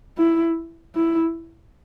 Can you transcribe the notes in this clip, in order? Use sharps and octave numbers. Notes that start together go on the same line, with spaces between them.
E4
E4